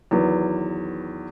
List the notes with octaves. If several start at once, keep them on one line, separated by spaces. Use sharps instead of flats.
E2 D#3 F#3 B3